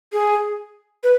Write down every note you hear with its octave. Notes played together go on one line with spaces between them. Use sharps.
G#4
B4